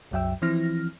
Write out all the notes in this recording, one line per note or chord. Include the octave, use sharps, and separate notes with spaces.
C2 F#2 F#3 E5 G5 E6
E3 F3 C4 E4 F6 A#6